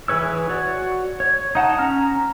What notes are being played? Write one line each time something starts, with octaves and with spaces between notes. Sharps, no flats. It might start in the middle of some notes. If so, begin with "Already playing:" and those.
E3 G#4 B4 C#5 E6
F#4 C#5 D5
C#5
D#4 F#5 A5
C#4 A#5 F6